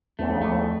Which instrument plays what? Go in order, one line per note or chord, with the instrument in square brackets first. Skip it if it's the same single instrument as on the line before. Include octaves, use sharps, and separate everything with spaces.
[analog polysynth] E2 [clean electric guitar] A3
[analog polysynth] F2
[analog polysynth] E2 [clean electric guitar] A3
[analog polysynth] F2